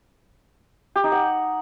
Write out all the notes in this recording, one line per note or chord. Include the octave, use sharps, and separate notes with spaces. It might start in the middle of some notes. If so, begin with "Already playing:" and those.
G4
D#4
F#5